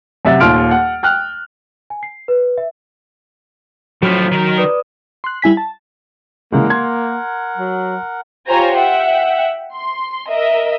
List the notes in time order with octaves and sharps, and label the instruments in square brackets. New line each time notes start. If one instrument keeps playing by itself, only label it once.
[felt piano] F#2 C3 E5 F#5 A6
D#1 D#2 F4 C6 F6 D7
F#5
G5 F6 F#6
[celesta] G#5
C7
B4
E5
[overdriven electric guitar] A2 F3 [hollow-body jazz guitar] F#3 [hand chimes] F#4 F6 B6
[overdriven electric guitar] D#3 A#4
[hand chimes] B4 D5 D#6
[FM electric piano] C6 F#6
G3 E4 G#5 B6
A5
[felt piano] C#3 E3 G#3 [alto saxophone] A#3 [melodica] A#4 F#5
[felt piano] C6 G#6
[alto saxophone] F#3
[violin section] F4 G4 C5 C#5 G#5 A#5
E5 F#5 G5
C6
A#4 D#5 E5